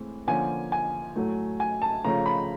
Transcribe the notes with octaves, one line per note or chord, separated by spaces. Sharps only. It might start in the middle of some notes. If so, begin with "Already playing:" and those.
Already playing: A2 E3 G#3 C4
D3 F3 A#3 C#4 G#5
G#5
A2 F#3 A3
G#5
A5
C#3 F3 A3 C#4 F4 A#5
B5